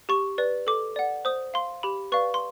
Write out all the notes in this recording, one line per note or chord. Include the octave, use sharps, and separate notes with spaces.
G4 C#6
B4 D5
A4 D6
D5 F#5
C5 D#6
F5 C6
G4 B5
B4 D5 F5 C#6
C6